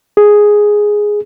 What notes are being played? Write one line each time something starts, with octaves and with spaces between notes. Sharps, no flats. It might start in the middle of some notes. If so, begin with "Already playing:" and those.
G#4